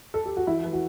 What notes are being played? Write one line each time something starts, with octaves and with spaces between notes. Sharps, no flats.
A4
G4
F#4
E3 E4
E3
F#4